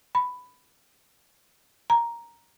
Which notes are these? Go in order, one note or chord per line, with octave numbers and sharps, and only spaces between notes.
B5
A#5